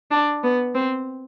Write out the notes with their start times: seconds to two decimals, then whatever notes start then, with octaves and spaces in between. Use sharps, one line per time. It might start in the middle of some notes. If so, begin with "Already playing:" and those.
0.11 D4
0.43 B3
0.75 C4